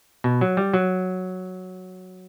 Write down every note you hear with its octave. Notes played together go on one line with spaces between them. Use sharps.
B2
F#3
G3
F#3